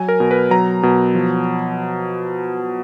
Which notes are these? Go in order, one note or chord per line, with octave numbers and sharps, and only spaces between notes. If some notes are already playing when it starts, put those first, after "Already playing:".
Already playing: F#3 G#5
A#4
B2
B4
F#3 A#5
B2
F3